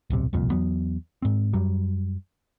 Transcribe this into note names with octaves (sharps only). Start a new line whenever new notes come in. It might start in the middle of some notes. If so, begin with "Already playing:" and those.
D1 B1 C3
E1 C2 F2 A#2
E2 F#3 B3
G#2 C4
F#2 F#3 G3